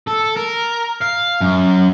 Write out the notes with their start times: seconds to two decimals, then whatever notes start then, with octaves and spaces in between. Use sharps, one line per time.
0.08 A4
0.37 A#4
1.01 F5
1.41 F#2